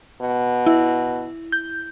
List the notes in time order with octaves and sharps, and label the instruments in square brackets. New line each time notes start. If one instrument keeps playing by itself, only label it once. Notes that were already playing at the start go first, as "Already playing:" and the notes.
[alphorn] B2
[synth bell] E4
G6